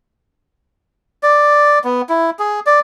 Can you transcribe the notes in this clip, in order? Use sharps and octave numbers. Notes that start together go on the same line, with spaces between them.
D5
B3
E4
G#4
D5